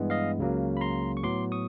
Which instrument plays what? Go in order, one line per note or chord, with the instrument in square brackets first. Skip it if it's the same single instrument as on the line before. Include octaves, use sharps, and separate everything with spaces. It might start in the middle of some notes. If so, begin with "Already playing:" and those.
Already playing: [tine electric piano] G2 E3 G#3 B3
D#5 F5
C#2 C#3 F#3 A#3
B5
A#5 C6
C#6
A2 F#3 B3 C6 D6
C#6 D#6